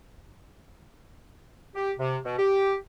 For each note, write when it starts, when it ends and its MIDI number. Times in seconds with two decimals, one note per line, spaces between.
1.75 1.92 67
1.99 2.17 48
2.24 2.35 47
2.38 2.75 67